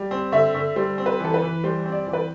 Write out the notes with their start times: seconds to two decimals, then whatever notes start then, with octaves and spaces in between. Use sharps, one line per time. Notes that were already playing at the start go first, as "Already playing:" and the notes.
Already playing: G3
0.11 C4
0.32 D3 E5
0.55 D3
0.76 G3 C5
0.98 C4
1.06 B4
1.20 E3 A4
1.34 B4
1.42 E3
1.64 G3 C5
1.86 C4
1.92 D5
2.07 E3
2.13 B4